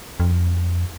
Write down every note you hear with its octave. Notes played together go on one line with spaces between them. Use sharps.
F2